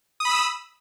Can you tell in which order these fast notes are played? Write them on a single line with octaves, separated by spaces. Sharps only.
D#6 B5 E6